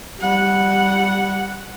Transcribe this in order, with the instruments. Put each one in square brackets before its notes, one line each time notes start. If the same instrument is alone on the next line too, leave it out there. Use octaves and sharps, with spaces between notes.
[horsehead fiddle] G3 F#5